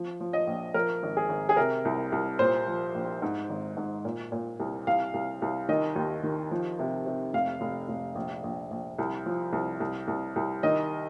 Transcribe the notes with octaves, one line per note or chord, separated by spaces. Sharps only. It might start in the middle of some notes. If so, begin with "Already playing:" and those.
Already playing: F3
F3
D#5
A#1
F3 A#4
G#1
G#4
G#1
G#4
C3 A#4
C2
C2
A#2 C5
F3
A#1
G#2
G#1
G#2
A#2
A#2
C2
C2 F5
C2
C2
D#3 D#5
D#2
D#3
F3
C3
C3
F1 F5
F1
F1
A#1
A#1
A#1
C2
F3
C2
C2
C2
C2
D#3 D#5